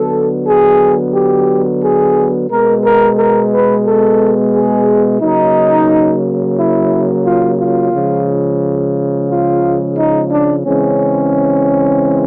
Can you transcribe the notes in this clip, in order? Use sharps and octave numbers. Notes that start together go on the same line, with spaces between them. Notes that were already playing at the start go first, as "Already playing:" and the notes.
Already playing: D3 F#3 B3 A4
G#4
G4
G#4
B2 G#3 B3 A#4
A#4
A#4
B4
A4
G#4
C#3 F#3 A#3 D#4
E4
F4
F4
C#3 F3 G#3
F4
D#4
D4
C#3 E3 G#3 C4 C#4